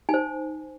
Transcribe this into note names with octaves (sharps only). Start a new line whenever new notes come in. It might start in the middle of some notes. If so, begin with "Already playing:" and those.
D#4 G#5
C5